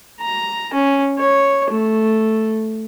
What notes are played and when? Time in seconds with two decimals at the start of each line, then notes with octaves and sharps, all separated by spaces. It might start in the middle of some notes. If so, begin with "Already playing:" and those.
0.20 A#5
0.73 C#4
1.18 C#5
1.70 A3